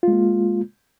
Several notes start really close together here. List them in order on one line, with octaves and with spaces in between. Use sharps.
F4 G#3 A#3